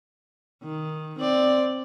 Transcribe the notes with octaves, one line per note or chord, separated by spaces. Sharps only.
D#3
C4 D5